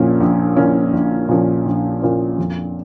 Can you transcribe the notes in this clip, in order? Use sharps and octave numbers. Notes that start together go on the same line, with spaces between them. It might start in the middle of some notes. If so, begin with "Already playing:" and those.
Already playing: A#1 A#2 F3 A#3 C#4
A#1
A#2 F3 A#3 C#4
A#1
A#2 F3 A#3 C#4
A#1
A#2 F3 A#3 C#4
F2